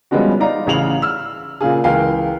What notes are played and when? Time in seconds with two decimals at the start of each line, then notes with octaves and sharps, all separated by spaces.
0.11 F3 G3 G#3 B3 C#4 F#4
0.40 D#4 D5 F5 A#5
0.67 A1 C#3 F5 F7 F#7
1.02 E6 F6
1.61 A#2 C#3 F4 G#4
1.84 C#2 E3 A#4 F5 G5 G#5